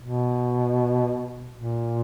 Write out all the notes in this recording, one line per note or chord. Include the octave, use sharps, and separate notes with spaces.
B2
A#2